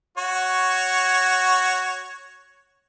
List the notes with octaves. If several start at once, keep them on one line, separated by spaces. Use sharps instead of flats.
F#4 C#5